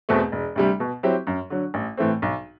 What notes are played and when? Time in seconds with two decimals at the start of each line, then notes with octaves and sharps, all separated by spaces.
0.09 E2 B2 A3 C4
0.32 E1
0.56 D2 C3 G3
0.80 B2
1.03 F#3 C4 E4 G4
1.27 F#2
1.50 D3 F#3
1.74 A1
1.97 A2 E3 A3 C4
2.22 B1